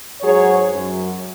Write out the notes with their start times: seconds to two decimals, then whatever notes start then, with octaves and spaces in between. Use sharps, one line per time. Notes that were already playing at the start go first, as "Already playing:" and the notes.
0.21 G#2 F#3 G#4 C#5
0.71 F#2 F#3